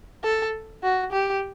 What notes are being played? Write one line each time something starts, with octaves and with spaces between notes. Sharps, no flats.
A4
F#4
G4